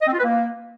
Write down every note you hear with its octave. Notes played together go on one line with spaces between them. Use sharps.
D#5
C4
F4
B4
A#3